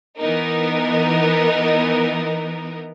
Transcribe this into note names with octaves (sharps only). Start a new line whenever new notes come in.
E3 B3 D#4 A#4